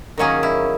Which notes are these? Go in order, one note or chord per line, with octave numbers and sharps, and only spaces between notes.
D#3 F#3 A#3 C#4 G#4
E4